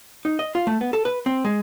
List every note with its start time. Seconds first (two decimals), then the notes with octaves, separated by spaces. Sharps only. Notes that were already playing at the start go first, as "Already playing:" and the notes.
0.25 D#4
0.39 D#5
0.55 F4
0.67 A3
0.81 B3
0.93 A4
1.05 B4
1.26 C4
1.45 G#3